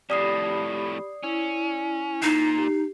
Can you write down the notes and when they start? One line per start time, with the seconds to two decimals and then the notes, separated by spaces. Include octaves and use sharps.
0.10 F2 A2 G4 D5 B5 D#6 C7
1.23 C#4 E4
2.22 A#2 D#4 C7
2.58 G4